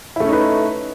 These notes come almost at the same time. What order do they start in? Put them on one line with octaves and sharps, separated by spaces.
E4 A3 C#4 D#4 B4